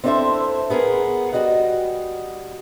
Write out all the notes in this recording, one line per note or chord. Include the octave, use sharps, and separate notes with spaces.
C4 D4 E4 A4 C5 E5
B3 G#4 A#4
G3 F#4 D#5 F#5